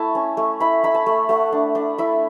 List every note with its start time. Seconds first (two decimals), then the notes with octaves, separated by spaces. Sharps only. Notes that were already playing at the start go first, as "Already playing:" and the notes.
Already playing: A3 E4 E5 A5
0.15 C#4
0.37 A3
0.60 E4 B5
0.83 E4 B5
0.94 A5
1.06 A3
1.29 A3 F#5
1.52 D4
1.75 D4
1.98 E4 E5